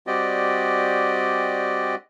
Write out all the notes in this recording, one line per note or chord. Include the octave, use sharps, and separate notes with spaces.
G3 C4 F#4 G4 D5 D#5